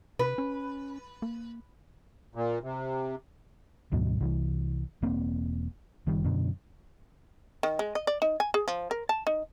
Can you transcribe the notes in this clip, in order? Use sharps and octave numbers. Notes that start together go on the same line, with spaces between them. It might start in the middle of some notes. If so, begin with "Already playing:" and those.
C3 B4
C#4
A#3
A#2
C3
D2 G#2 B2 F#3
C2 E3
E1 A#3 C4
F#1 D#3 G3
F#2 B2 D3
D#3
G#3
D#5
D5
D#4
G#5
G#4
F3
A#4
A5
D#4